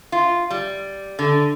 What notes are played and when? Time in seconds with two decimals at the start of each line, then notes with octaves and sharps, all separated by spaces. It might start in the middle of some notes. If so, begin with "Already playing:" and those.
0.12 F4
0.51 G3
1.19 D3